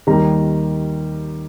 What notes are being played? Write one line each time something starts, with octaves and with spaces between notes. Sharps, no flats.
D#2 D#3 G3 A#5